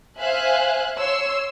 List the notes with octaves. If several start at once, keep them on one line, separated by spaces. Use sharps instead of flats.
C5 E5 F5 G#5 F#6
C#5 C6 E6